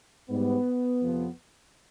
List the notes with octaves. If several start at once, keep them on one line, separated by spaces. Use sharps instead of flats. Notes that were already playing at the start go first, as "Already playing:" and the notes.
G#2 G3 B3
F2 C3 F3